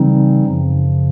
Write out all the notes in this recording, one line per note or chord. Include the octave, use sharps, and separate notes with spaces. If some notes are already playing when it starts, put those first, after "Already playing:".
Already playing: C#3 E3 G3 C4 D#4
F#2 C#3 F3